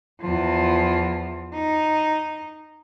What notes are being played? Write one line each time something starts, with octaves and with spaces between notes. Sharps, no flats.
E2 F3
D#4